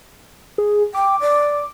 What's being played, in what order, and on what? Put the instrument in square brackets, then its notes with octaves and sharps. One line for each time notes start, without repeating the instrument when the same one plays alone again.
[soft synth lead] G#4
[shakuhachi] G5 [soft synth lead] D6
[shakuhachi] D5